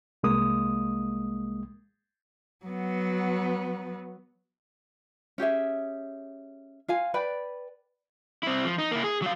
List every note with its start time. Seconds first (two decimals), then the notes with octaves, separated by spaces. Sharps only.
0.23 C2 G#3 A#3 D#6
2.65 F#3 B3
5.38 C#4 G4 G#4 E5
6.88 F4 F5 G#5
7.14 B4 D5 G5 B5
8.43 C4 E4
8.65 F3
8.78 D#4
8.91 A#3 E4
9.04 G#4
9.22 F#3 F5